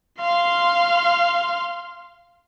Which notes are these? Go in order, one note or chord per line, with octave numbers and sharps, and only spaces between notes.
F5 C6